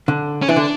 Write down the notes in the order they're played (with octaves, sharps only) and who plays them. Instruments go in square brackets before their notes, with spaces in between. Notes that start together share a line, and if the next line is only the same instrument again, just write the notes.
[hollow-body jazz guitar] D3
[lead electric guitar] C#4
[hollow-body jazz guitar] E3 [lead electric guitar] D4
[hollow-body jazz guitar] D3